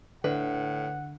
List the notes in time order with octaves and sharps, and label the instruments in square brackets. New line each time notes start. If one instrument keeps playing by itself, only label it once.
[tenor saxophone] A2 [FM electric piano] D3 [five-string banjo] B4 [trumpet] F#5